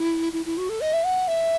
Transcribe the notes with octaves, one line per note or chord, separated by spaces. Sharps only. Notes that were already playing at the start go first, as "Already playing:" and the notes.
Already playing: E4
E4
E4
F#4
A4
D#5
E5
F#5
E5